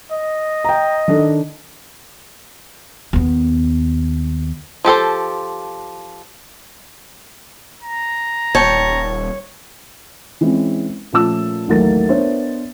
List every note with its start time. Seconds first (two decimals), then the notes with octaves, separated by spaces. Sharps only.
0.11 D#5
0.65 G5 A#5
1.08 D#3 D4 A4
3.13 D#2 B3
4.85 F3 G4 A4 C5
7.83 A#5
8.55 D#1 C#5 G5 A5
10.41 E3 G#3 C4 C#4
11.13 A#2 F3 A3 C#4 A5 E6
11.68 A1 D#2 F#3 A3 A#3 A6
12.09 B3 D4 A#4 C5 C#5 E5